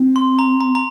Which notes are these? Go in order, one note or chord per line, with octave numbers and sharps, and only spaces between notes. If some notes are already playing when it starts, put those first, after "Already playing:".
Already playing: C4
C6
A#5
A#5
A#5